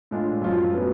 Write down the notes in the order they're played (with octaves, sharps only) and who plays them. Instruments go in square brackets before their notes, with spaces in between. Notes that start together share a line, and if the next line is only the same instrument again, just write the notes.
[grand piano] A2 G#3 D4 F4
F#2 F3 G#3 C#4 F4
A2 F#3 B3